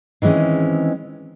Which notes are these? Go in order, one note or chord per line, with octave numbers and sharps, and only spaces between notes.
D#3 E3 G#3 C4 C#4